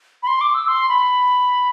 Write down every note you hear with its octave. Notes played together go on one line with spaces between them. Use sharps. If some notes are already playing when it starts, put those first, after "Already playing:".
B5
C6
D6
E6
C6
B5